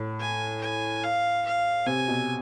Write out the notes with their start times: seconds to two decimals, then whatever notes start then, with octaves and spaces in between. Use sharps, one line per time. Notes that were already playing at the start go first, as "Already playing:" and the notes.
Already playing: A2
0.20 G#5
0.61 G#5
1.04 F5
1.45 F5
1.86 C3 G#5
2.08 B2